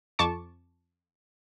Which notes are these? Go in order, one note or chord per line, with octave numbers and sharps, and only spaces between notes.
F2 A5 C#6 D6 C#7